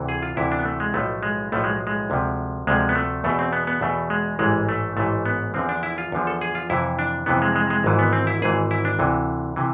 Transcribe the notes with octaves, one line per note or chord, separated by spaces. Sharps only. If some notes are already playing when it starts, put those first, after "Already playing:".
Already playing: D2 C3 E3
G#4
F4
D2 C3 E3 E4
D4
B3
A3
G#3
B1 A2 F3 A3
G#3
B1 A2 F3 A3
G#3
G#3
D2 C3 F3
D2 C3 F3 G#3
B3
A3
E2 B2 A3
C4
B3
B3
E2 B2 A3
G#3
A1 G#2 E3 G#3
A3
A1 G#2 E3 A3
B3
E2 D3 F3 C4
D4
E4
F4
E2 D3 F3
A4
G#4
F4
F2 C3 E3 E4
D4
F2 C3 E3 B3
G#3
G#3
G#3
G#1 G#2 E3
B3
C4
E4
G#1 G#2 E3 G#4
E4
D4
D2 C3 E3
C3 E3